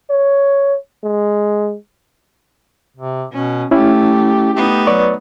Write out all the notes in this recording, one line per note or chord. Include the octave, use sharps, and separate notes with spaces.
C#5
G#3
C3
B2 C#4
A3 C#4 E4 G4
A3 B3 D#4 G4
F#3 B4 D5 C#6